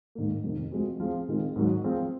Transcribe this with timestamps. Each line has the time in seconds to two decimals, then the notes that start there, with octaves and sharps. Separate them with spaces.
0.15 G#2 D#3 A#3
0.44 F2 C3 D#3
0.72 F3 G#3 C4 F#4
1.00 F3 C4 F4 G#4
1.29 D#3 G#3 C4 F4 G#4
1.56 G#2 D#3 F#3
1.84 F3 C4 F4 G#4